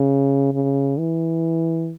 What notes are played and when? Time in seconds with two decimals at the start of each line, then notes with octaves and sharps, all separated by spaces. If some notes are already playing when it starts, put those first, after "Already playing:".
Already playing: C#3
0.53 C#3
0.98 E3